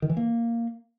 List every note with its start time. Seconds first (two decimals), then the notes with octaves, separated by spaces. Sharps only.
0.02 D#3
0.10 E3
0.17 A#3